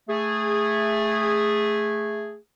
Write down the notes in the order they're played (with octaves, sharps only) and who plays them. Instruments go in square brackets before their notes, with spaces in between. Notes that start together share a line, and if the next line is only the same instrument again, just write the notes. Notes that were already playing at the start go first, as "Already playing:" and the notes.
[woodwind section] A3 G#4